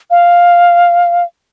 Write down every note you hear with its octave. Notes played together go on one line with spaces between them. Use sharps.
F5